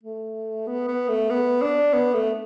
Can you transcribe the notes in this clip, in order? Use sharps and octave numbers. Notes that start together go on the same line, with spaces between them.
A3
B3
B3
A3
B3
D4
B3
A3